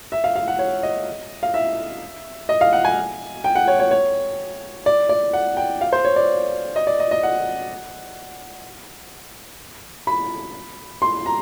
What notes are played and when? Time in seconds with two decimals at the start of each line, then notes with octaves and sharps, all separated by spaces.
0.12 E5
0.24 F5
0.36 F5
0.48 F#5
0.59 C#5
0.83 D#5
1.43 F5
1.54 E5
2.49 D#5
2.61 F5
2.73 F#5
2.85 G#5
3.44 G5
3.55 F#5
3.68 C#5
3.80 C#5
3.91 C#5
4.86 D5
5.09 D5
5.33 F#5
5.57 G5
5.81 F5
5.93 C5
6.05 C#5
6.16 D5
6.76 D#5
6.87 D5
7.00 D#5
7.11 D#5
7.23 F#5
10.07 B5
11.02 C6
11.26 A#5